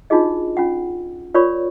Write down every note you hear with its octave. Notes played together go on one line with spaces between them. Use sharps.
D4 D#4 F4 F#4 G#4 D#5
C#4 F4 F#5
F4 A#4 C#5 D5 B5 C#6